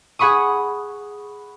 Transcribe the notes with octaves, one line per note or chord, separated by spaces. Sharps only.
G#4 F#5 B5 C#6 D#6